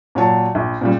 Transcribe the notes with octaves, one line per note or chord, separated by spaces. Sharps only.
A#2 F#3 C#5 A5
A#1
A#2 C#3 G3